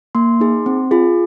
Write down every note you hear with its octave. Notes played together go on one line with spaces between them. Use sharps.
A#3 C6
D#4 G#4
C4
F4 G#4